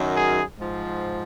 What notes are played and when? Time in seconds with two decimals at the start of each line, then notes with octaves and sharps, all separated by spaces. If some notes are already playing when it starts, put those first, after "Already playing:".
Already playing: F#2 D#3 F#3
0.14 G#4
0.58 G#2 F3